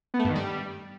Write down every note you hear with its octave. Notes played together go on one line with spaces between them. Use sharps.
B3
A3
G2
D#3
G3